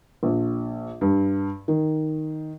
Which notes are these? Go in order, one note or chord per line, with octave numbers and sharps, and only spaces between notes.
A#1
G2
D#3